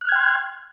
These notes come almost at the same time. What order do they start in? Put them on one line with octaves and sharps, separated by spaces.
F#6 F6 G#6 G5 C6